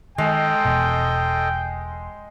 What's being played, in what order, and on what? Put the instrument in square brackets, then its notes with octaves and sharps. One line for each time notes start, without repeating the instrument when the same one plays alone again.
[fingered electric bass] D#3 [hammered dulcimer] G#3 [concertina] A4 D#5 [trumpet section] G5
[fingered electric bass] E1 B2